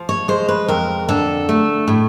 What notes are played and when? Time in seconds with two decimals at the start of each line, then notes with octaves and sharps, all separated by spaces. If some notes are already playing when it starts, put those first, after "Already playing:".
Already playing: F3
0.09 C#5
0.28 G#3 C5
0.49 B4
0.68 F2 A#4
1.09 D3 A4
1.49 A3
1.88 A2